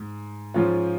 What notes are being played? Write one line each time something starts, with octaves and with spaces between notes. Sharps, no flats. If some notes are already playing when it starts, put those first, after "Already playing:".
Already playing: G#2
G#2 F3 C#4 F4